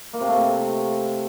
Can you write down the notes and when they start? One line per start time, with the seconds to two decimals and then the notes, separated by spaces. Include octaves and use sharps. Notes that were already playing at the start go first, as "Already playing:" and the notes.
0.13 A#3
0.21 C3
0.28 A3
0.35 C3